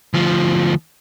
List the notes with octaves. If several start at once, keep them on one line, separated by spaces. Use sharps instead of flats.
D2 F3